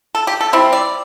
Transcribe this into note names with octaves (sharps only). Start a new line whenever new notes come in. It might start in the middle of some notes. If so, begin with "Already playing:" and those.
A4
G4
A4
G3 C4 E4
D5